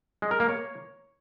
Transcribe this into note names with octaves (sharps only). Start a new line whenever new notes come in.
G#3
A#4
A#3
C#5